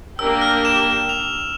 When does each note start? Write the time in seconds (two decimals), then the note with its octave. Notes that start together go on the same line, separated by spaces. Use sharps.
0.19 A#3 D4 G4 A#4 E6
0.41 F6
0.65 E7
1.09 F7